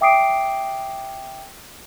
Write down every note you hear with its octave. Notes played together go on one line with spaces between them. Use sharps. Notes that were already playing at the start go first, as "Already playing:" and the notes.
E5 G5 D6 D#6 C7 D7